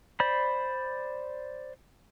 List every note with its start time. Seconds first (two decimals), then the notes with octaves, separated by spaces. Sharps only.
0.20 C5 D5 B5